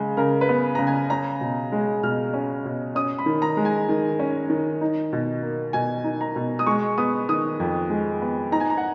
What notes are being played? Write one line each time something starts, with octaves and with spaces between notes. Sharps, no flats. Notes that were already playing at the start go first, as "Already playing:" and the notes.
Already playing: C#3 G#3
C#3 A#4
B4
B3
C#3 A#5
G#5
C#4 A#5
B2
G#3
B2 F6
C#4
B2
C#4 D#6
B5
D#3
A#5
G#3
G#5
D#3
C#4
D#3
D#4
B2
A#3
B2 G#5
D#4
A#5
B2
D#6
G#3 C#6
B3 D#6
D#3 D#6
F2
G#3
B3
D#4 A#5
G#5
A#5
F#5